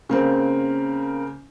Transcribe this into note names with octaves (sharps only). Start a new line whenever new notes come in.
C#3 A#3 C4